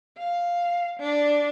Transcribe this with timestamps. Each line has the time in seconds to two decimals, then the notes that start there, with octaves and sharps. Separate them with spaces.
0.18 F5
1.00 D4